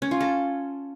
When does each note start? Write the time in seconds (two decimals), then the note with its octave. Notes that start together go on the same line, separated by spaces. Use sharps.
0.02 C#4
0.11 F4
0.21 A4